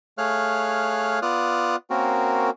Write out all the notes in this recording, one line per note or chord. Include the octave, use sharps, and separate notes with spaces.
A3 G#4 C#5 F5 F6 F#6
B3 F4 D5 D#6 F6 F#6
A#3 C4 C#4 F#4 A#4